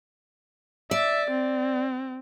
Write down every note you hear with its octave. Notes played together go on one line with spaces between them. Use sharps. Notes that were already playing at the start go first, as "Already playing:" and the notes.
D5 E5
C4